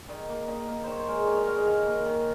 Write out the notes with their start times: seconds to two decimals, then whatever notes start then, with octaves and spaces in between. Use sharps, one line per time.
0.09 D#3 D#5
0.29 A#3
0.48 D#3 D#5
0.68 A#3
0.84 D#3 C5 C#5
1.00 C5
1.08 G#3 A#4
1.23 D#3 C#5 D#5
1.37 D#5
1.47 G#3 F5
1.56 D#5
1.67 D#3 F5
1.87 A#3
2.06 D#3